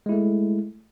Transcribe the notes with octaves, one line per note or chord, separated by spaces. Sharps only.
G#3 A3 E4